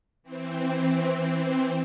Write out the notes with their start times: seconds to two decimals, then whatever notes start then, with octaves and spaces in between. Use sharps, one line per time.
0.23 E3 C4